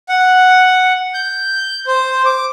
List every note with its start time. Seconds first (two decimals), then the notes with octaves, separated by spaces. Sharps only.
0.09 F#5
1.14 G6
1.87 C5
2.26 D6